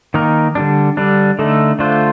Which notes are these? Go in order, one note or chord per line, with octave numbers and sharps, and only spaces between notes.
D#3 A#3 D#4 A#4
D3 G3 D4
D3 G3 D4
D3 A3 D#4 A4
D3 A3 D4 F4 C5